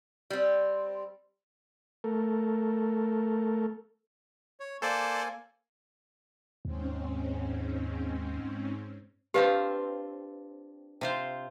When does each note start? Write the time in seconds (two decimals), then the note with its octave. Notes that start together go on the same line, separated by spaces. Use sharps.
0.30 G3 C4
2.04 A3 A4 A#4
4.60 C#5
4.82 A#3 A4 C5 D5 G#5
6.65 D#2 G#2 C4 C#4
9.34 C4 D4 F4 G4 B4 F5
11.01 C3 F4 C5